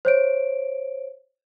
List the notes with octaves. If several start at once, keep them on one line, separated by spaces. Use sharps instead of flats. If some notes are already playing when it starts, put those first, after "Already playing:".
C5 C#5 D7